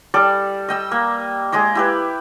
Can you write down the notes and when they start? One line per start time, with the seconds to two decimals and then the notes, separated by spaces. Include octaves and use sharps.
0.14 G3 A4 D5
0.69 D#5 G5 E6
0.91 A#3
1.52 G#3 G#4 D#5 D6
1.75 E4 G4 B4